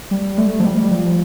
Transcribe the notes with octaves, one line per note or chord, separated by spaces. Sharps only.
G3
A3
F3
G3
G3
F3